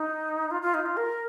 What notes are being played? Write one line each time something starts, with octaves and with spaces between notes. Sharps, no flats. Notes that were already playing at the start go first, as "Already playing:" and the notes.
Already playing: D#4
F4
F4
D#4
F4
A#4